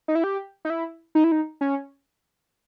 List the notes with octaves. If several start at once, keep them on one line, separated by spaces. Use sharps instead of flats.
D#4
E4
G4
D#4
E4
D#4
E4
D#4
C#4